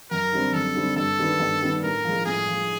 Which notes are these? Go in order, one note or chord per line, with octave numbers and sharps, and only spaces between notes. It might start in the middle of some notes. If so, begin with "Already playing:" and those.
F#2 A#4
D3 G3 C4
F#2 A4
D3 G3 C4
G2 A4
D#3 G3 B3 D4
G2
D#3 G3 B3 D4
A2 A#4
F3 G#3
A2 G#4
F3 G#3